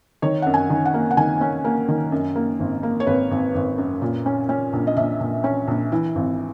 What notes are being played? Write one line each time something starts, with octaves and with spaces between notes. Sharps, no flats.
D#3 C#5
F#2 F#5
G#5
D#3
F#5
A#3
F#5
D#3 G#5
C#4
A#3
D#3
F#2
A#3
G#1
A#3
C#5
G#1 B4
G#1
G#1
F#2
A#2
C#4
C#4
A#1
D#5
A#1 E5
A#1
C#4
A#1
E3
G#1